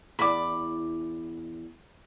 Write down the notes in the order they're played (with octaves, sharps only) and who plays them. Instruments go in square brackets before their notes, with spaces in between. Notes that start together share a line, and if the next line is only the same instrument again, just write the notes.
[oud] E2 D5 [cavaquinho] B5 D6